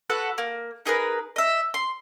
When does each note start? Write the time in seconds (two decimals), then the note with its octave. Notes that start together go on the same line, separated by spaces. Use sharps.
0.10 F#4 A4 B4 F#5
0.38 A#3
0.86 D#4 G#4 A#4 B4
1.36 D#5 E5
1.74 C6